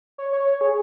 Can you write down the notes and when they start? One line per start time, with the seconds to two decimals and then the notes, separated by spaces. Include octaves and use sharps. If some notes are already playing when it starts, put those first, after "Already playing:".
0.18 C#5
0.33 C#5
0.47 C#5
0.61 G#4